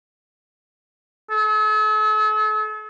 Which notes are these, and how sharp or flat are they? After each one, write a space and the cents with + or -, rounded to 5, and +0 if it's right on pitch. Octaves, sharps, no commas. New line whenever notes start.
A4 -45